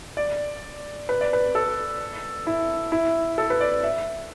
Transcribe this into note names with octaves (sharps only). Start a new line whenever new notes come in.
D5
B4
D5
B4
A4
E4
E4
A4
B4
D5
E5